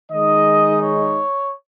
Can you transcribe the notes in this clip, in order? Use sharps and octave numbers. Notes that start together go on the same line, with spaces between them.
D#3 G#3 D#4 D#5
C#5